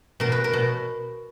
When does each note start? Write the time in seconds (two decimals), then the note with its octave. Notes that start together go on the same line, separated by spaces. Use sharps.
0.20 B2 A#4
0.32 B4
0.44 A#4
0.53 B2